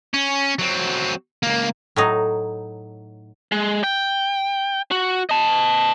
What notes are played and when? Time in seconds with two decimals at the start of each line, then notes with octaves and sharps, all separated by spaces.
0.14 C#4
0.59 F#3 C4
1.43 C#2 A#3
1.96 A2 F#3 D#4
3.52 G#3
3.84 G5
4.91 F#4
5.29 D#5 A5